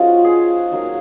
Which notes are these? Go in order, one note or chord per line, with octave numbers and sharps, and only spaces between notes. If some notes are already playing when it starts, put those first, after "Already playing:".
Already playing: F3 G#3 C#4 D#4 F4 F#4
G#4
F#3 A#3 D#4